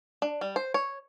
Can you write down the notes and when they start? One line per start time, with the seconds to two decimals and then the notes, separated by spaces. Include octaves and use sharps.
0.22 D4
0.41 G3
0.56 C5
0.74 C#5